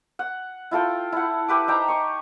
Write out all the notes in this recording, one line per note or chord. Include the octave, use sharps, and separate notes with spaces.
F#5
E4 F4 A4 G5
E4 F#5
G4 B4 D6
D#4 C5 G5 A#5
D#5 C#6